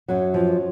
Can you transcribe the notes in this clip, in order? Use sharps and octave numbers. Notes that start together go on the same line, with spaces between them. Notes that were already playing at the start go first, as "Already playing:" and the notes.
F#2 F#3
F3